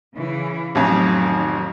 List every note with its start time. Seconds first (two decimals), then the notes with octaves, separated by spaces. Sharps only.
0.16 C#3 E3
0.75 A1 F2 D#3 F#3